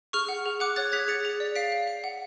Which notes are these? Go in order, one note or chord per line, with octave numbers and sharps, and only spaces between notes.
G#4 C#6 F6
F#5
G#4
F#5 D6 F#6
C#5 F#6 A6
G#4 G#6 B6
G#4 A6 C#7
G#4
D5
F5 B6 D7
F5
F5
F#5